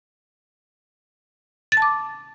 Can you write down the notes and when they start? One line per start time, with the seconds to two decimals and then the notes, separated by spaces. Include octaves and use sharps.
1.72 A6
1.77 A5
1.82 D6